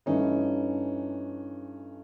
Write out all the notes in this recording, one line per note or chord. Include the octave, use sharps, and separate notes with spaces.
G2 E3 A3 C#4 D#4